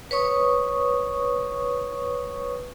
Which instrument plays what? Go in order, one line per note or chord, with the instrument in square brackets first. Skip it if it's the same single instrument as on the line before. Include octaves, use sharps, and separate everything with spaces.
[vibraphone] B4 C#5 C#6 D#6